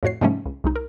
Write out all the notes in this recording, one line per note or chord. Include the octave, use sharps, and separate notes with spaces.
F2 A2 F#4 C#5 C7
G#2 C3 F3 G3 A3 C#4
C#2
C2 G#3 D#4
A#4